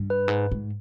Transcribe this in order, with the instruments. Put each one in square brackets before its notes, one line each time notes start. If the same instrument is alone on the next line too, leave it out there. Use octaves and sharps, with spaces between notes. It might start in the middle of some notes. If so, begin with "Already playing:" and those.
Already playing: [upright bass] G2
[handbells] B4
[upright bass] G#2
G#2